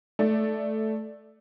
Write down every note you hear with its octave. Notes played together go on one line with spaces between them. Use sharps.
A3 D5